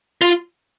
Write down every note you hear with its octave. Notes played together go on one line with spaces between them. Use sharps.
F4